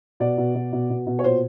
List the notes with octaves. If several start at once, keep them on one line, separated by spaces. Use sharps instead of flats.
B2 D5
B2
B2
B2
B2
B2
C#5
A#2 C5